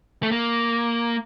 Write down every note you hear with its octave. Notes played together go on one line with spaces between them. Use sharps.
A3
A#3